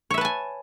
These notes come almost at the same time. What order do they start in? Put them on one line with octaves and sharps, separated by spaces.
C#5 E5 B4 A5 G#5